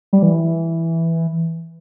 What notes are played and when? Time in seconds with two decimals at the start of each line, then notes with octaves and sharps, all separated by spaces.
0.13 G3
0.22 E3